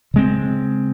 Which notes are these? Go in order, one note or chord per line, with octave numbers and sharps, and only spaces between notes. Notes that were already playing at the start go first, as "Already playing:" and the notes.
C#3 G#3 C4